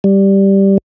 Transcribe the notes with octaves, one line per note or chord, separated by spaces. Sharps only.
G3